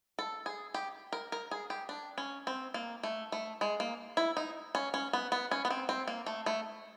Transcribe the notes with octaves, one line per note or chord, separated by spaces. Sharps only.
A4
G#4
G4
A#4
A#4
G#4
G4
D4
C#4
C4
A#3
A3
A3
G#3
A#3
E4
D#4
C#4
C#4
B3
B3
C#4
B3
C4
C4
A#3
A3
A3